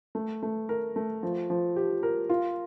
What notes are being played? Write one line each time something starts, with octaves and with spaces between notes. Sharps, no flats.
A3
A3
A#4
A3
F3
F3
G4
A#4
F4